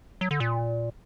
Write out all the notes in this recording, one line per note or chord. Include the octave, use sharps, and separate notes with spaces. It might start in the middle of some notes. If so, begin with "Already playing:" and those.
F#3
D3
A#2